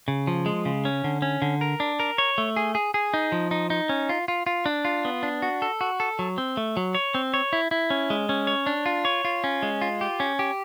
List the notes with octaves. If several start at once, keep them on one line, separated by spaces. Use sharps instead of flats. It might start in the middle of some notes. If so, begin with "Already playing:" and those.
C#3
F3
G#3
C#3
C#4
D3
C#4
D3
A#4
D4
A#4
C#5
A3
G#4
G#4
G#4
D#4
F3
D#4
D#4
C#4
F4
F4
F4
D4
F4
B3
D4
F#4
A4
F#4
A4
F#3
C4
A3
F#3
C#5
C4
C#5
E4
E4
C#4
G#3
C#4
C#5
D4
F4
C#5
F4
C#4
G#3
F4
G4
C#4
G4